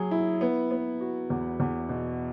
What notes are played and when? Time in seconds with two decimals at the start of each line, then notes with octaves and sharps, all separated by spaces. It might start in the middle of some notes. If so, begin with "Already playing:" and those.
Already playing: F#3 G#4
0.11 E4
0.41 B3
0.71 B3
1.01 F#4
1.30 E2
1.60 E2
1.89 B2